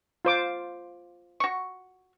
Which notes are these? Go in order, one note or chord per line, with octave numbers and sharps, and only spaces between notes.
F4 C5 D6
F#4 C#6